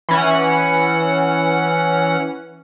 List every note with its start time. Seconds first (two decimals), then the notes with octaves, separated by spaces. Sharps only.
0.09 E3 C#4 F#5